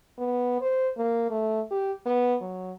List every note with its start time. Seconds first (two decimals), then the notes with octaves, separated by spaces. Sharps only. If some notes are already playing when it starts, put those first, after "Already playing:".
0.18 B3
0.61 C5
0.97 A#3
1.30 A3
1.71 G4
2.06 B3
2.41 F#3